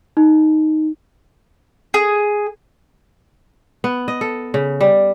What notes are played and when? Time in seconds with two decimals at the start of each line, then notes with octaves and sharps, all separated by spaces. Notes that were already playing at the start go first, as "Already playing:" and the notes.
0.17 D#4
1.94 G#4
3.84 B3
4.08 D#5
4.21 A4
4.54 C#3
4.81 G3